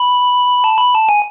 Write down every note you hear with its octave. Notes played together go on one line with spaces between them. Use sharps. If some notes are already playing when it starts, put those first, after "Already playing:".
Already playing: B5
A5
B5
A5
G#5